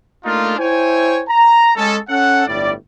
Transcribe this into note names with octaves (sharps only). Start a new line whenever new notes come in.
A3 A#3 D4 D#4 F4
E4 C5 C#5 G5 G#5
A#5
G#3 C#4 A4
C#4 A4 F#5
G1 A2 G3 D5